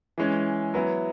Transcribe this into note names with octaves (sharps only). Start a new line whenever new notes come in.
E3 G#3 C#4
F#3 B3 E4